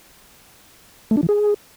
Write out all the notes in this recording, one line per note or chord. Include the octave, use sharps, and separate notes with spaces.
A3
D4
E3
G#4